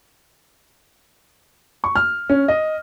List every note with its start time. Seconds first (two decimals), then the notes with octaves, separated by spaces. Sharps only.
1.84 C#6
1.96 F6
2.30 C#4
2.48 D#5